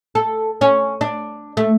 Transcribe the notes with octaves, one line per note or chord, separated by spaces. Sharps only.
A4
C#4
D4
A3